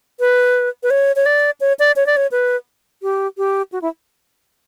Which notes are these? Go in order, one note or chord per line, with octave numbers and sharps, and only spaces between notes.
B4
B4
C#5
C#5
D5
C#5
D5
C#5
D5
C#5
B4
G4
G4
F#4
E4